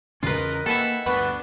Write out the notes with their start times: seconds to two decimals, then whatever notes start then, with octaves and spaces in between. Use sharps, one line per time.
0.23 E2 C#3 C#4 F4 A#4 B4 D#5
0.66 D#3 E3 A#3 A4 E5 F#5 B5
1.06 D2 G2 B3 D4 F#4 B4